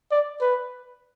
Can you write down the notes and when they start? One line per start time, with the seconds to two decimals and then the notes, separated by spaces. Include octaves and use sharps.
0.11 D5
0.41 B4